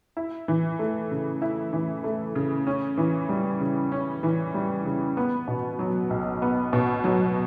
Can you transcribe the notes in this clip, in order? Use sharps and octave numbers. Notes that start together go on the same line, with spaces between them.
E4
E3
A3
C#3
E4
E3
A3
C#3
C#4
E3
G3
C#3
C#4
E3
G3
C#3
B3
B2
F#3
B1
B3
B2
F#3